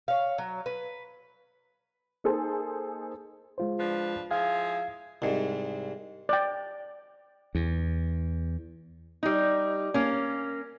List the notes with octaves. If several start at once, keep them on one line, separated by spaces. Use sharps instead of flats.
C#5 F5
F#3
B4
A#3 D#4 G#4 A4 C5
G#3 F4 C5
F3 D4 B4
F3 E4 G#4 F5
C2 G#2
D5 G5
E2
G3 D#4
A#3 C#4